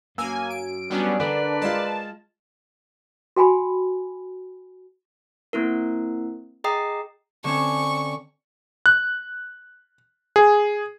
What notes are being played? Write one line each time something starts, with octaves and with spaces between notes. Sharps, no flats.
F#2 A#3 G#5 E6
D7
F#3 G3 B3 C#4 D4
D3 D4 A#4 B4 D5
G#3 F4 A5
F#4 G5 G#5 B5
A#3 C4 E4 A#4
G#4 D#5 G5 A#5 D#6 C7
D3 C4 C#4 C#6
F#6
G#4